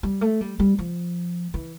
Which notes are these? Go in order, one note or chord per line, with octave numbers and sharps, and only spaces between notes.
G3
A3
G3
G3
F3
E3